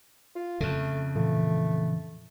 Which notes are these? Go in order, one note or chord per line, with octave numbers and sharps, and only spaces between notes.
F4
F2 C#3 A3
A#2 E3 F3 A3